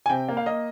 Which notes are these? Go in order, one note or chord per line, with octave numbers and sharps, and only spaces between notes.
G#5
C3 G5
A#3
F5
A#3 D#5